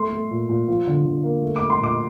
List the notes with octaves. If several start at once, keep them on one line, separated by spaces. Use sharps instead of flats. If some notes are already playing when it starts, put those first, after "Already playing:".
Already playing: A3 C6
A3
A#2
A#2
F3
D3
D3
A#3
A3
D6
A3
C6
A#2 D6